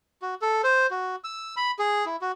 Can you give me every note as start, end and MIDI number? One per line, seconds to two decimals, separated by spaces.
0.22 0.35 66
0.42 0.62 69
0.64 0.87 72
0.91 1.16 66
1.24 1.55 88
1.57 1.71 83
1.79 2.05 68
2.06 2.16 64
2.21 2.32 66